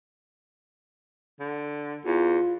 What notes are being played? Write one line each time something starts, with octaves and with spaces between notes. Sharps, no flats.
D3
E2 F4